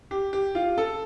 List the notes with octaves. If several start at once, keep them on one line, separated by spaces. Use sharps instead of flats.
G4
G4
F4
A4